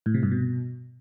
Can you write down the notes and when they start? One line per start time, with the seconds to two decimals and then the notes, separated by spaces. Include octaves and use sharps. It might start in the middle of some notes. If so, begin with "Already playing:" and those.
0.06 A2
0.14 C3
0.23 G2
0.31 B2